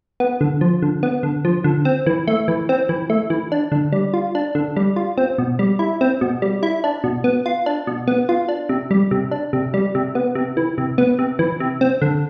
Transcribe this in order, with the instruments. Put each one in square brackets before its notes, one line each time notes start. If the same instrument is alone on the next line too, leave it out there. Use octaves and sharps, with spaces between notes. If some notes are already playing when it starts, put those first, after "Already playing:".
[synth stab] B3
D3
F3
D3
B3
D3
F3
D3
C4
E3
A3
E3
C4
E3
A3
E3
D4
D3
G3
F4
D4
D3
G3
F4
C4
B2
G3
E4
C4
B2
G3
E4
D4
B2
B3
F4
D4
B2
B3
F4
D4
C3
G3
C3
D4
C3
G3
C3
B3
C3
E3
C3
B3
C3
E3
C3
C4
D3